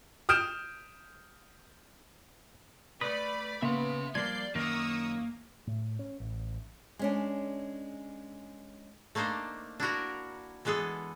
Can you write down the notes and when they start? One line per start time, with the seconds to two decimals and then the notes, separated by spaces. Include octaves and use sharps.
0.29 D#6 F6 G6 D7 E7
3.01 A3 B4 D5 B5 D#6
3.62 C#3 A#3 B3 E5 C6
4.15 F3 G3 A#3 D5 G6 G#6 C7
4.55 F#2 D#3 A#3 A#4 C#6 D#6 E6
5.67 A2
5.99 C#4
6.20 A1
6.99 G#3 C#4 D4
9.15 A3 A#3 D4 D#4 C5
9.80 D4 E4 F#4 A#4
10.65 E3 G#3 B3 G#4 A4